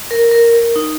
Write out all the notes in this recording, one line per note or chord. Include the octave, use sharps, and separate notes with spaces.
A#4
A#4
A#4
D#4